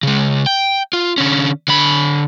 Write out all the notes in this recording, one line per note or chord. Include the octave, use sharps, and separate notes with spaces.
C#3 G#3
G5
F4
D3 C#4
D3 B5